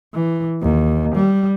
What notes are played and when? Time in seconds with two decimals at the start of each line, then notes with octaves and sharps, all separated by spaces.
0.14 E3
0.62 D#2
1.15 G3